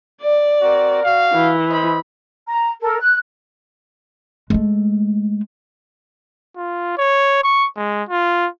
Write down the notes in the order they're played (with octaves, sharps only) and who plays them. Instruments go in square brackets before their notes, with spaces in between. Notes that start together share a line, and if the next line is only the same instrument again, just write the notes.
[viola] D5
[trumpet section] C4 F#4 A#4
F#4 F5
[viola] E3
[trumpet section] C5 D#5 B5
[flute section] A#5
A4 A#4
F#6
[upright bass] G#3 A3
[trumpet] F4
C#5
C#6
G#3
F4